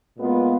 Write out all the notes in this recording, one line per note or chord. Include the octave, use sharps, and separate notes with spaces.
A#2 G#3 B3 F4